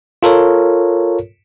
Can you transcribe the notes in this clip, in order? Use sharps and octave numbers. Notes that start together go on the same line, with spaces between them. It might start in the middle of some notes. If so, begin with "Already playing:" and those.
F4 A4 A#4 C#5